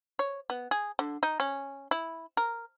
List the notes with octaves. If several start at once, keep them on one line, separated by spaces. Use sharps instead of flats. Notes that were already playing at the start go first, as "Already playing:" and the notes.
C#5
B3
G#4
D3
D#4
C#4
E4
A#4